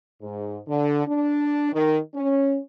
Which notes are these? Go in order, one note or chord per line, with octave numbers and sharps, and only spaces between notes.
G#2
D3
D4
D#3
C#4